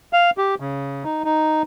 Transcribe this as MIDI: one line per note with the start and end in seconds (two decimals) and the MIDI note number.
0.13 0.30 77
0.38 0.55 67
0.60 1.04 49
1.04 1.23 63
1.25 1.62 63